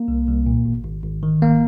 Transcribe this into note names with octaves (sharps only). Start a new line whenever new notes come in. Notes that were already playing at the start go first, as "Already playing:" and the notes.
Already playing: A#3
C2
C2
A#2
G#1
G#1
G#1
D#3
G#1 A#3